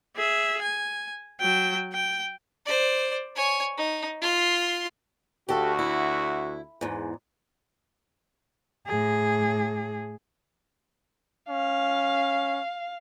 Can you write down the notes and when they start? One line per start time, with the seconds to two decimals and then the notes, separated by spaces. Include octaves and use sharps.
0.16 G#4 E5
0.62 G#5
1.40 F#3 G5
1.93 G5
2.66 C5 D5
3.35 C#5 G#5
3.77 D#4
4.21 F4 C6
5.49 D2 F#4 G4 A4 F5
5.79 E4
6.81 E2 G#2
8.87 A2 G#4
11.49 C#4 F5